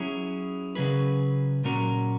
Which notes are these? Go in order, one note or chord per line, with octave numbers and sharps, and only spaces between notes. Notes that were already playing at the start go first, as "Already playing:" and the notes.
Already playing: F#3 C#4 E4 G#4
C#3 F#3 C#4 G#4 B4
A#2 F#3 C#4 F#4 A#4